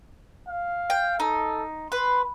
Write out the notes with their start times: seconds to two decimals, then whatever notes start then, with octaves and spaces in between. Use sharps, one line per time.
0.49 F5
0.90 G5
1.20 D#4 A4
1.92 B4 C6